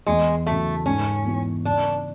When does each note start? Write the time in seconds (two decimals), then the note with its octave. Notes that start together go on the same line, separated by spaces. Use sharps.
0.06 E2 G#3
0.46 C#3 F#3 A3
0.85 G#2 C#4
1.25 E3 B3 E4
1.65 C#3 D4